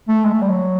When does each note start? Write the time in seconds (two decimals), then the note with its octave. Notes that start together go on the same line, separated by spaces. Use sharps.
0.08 A3
0.25 G#3
0.33 A3
0.42 G3
0.50 F#3